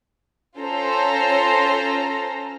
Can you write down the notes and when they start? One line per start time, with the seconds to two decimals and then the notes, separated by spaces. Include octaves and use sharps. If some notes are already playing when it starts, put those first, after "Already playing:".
0.58 C#4 F4 A4 C5 A#5